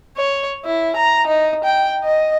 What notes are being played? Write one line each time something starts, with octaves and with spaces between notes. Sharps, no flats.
C#5
E4
A#5
D#4
G5
D#5